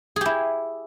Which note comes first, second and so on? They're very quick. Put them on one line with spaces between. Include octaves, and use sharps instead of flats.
G#4 G4 E4